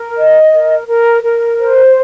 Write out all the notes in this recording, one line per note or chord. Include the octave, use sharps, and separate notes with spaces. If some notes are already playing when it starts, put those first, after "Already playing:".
Already playing: A#4
D#5
A#4
A#4
A#4
C5